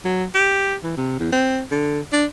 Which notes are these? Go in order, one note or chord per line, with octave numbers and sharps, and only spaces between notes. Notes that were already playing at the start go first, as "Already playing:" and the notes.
F#3
G4
E3
C3
E2
C4
D3
D4